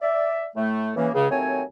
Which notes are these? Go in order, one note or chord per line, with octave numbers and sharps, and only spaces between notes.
D5 E5
A2 A3
C#3 E3 A#3
C#2 C#3
D#2 F#3 A3 C4 C#5 G#5